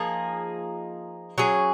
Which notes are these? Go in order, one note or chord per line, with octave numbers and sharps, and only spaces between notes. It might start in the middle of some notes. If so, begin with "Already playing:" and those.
Already playing: F3 A#3 D#4 G#4
F#3 C#4 G#4